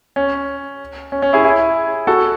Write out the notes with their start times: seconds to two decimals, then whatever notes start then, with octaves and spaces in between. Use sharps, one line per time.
0.16 C#4
1.12 C#4
1.22 C#4
1.33 E4 G#4
1.44 E4 G#4
2.07 F#4 A4